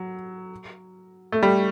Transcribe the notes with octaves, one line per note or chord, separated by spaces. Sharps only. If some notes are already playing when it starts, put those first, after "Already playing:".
Already playing: F#3
A3
G3